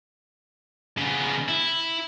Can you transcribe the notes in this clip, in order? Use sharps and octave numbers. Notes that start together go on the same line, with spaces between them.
C#3 B3
E4